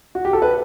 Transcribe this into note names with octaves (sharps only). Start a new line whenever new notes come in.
F#4
G4
A4
B4